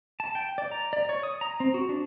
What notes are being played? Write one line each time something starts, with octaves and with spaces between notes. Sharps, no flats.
A5
G5
D5
A#5
D5
C#5
D#6
A#5
C4
F#4
D4